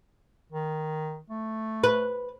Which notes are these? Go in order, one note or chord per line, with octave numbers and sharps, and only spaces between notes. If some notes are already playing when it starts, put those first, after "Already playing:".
D#3
A3
B4